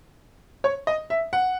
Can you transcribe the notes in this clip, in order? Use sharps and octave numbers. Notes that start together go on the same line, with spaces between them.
C#5
D#5
E5
F#5